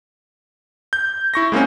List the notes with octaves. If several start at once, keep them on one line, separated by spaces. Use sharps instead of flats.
G6
E4 C#6 A#6
G#3 A#3 C4 C#4